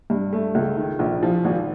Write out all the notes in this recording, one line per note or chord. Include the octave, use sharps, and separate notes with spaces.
G2
A3
C#2
D#3
A#1
F3
G#1